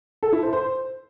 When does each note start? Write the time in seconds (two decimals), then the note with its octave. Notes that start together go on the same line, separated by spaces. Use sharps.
0.23 A4
0.33 E4
0.43 C5
0.53 C5